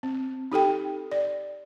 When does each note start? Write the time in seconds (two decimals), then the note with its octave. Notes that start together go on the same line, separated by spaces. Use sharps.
0.03 C4
0.52 D#4 G4 A4 G5
1.12 D5